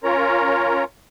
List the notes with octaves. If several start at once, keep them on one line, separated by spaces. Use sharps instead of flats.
C#4 F4 A#4 C#5 A#5